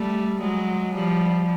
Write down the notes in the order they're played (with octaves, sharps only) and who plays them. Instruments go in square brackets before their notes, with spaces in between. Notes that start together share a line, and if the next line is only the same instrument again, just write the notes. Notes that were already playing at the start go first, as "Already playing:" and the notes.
Already playing: [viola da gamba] G3 A3
F#3 G#3
F3 G3